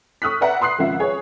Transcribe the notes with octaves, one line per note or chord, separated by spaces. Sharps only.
C#6 D#6 F6 F#6 B6
B4 D5 E5 F#5 G5 A#5
B5 C6 D#6 F#6 C7
G#1 C#3 F3 E5 F#5
G#4 B4 C#5